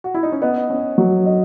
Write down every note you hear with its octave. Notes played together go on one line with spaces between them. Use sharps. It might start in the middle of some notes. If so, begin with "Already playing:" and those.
F#4
E4
D#4
C#4
B3 D#5
C#4
F#3
D#5